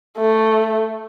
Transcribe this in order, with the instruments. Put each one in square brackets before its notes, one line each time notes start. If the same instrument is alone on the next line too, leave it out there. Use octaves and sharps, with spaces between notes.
[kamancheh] A3